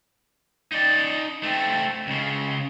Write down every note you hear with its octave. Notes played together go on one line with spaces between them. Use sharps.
D#4 D5
A3 C4
C#2 C#3